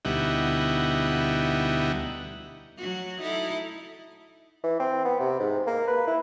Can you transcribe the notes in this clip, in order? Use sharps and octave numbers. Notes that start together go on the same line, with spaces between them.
D2 B2 G3 D#4 E4 F#5
F#3 F#4
D#4 E4 A4
E3
C4
B3
C3
G#2
A#3
B4
E4